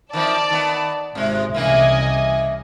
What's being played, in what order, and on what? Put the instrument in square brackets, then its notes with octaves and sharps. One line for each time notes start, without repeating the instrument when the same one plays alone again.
[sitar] D#3 F3 C4 [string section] D5 A5
[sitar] D#3 B3
[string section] G#1 [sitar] C3 G#3
[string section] C2 D#5 G#5 [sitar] C#3 E3 A#3